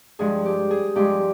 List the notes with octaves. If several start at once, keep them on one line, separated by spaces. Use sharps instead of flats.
G2 F3 G#3 G#4
G4
G#4
G2 F3 G#3 G4